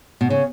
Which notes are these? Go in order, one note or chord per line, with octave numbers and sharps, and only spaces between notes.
B2
C#3 C#5